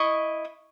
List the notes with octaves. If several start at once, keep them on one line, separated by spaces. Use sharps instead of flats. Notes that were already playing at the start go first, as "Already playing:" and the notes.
Already playing: E4 D#5 C#6